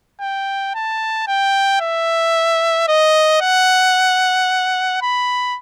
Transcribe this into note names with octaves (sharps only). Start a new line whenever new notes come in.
G5
A5
G5
E5
D#5
F#5
B5